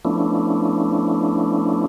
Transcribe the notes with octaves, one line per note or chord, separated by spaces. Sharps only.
F3 A3 B3 C#4 D4 E4